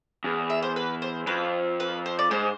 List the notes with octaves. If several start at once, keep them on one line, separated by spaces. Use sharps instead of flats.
E2
E5
C5
B4
C5
F2 B4
B4
C5
D5
G#2 C5